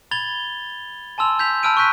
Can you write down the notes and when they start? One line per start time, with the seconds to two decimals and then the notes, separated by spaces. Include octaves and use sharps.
0.11 B5 G#6 A6 F7 G7
1.18 G#5 A5 C6 E6 F7
1.39 G6 B6 F7
1.63 A5 B5 E6 F6 D7 D#7
1.77 C#6 E6 F#6 G6 B6 D#7